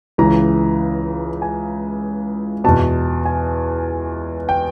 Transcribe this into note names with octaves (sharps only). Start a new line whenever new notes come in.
C#2 C#3 E3 A#5
G#5
E2 B2 A5
G#5
G5